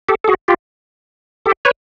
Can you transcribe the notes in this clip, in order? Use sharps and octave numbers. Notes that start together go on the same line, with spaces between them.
G4 A4
A4
F#4 G#4
F4 G4
G4 A4
B4 C#5